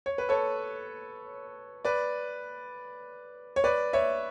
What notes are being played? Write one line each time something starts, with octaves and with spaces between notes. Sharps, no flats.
C#5
B4
A4 C#5
B4 D5
C#5
B4 D5
C#5 E5